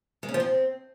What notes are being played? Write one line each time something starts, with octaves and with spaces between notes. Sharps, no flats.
G#3
C#4
F3
C4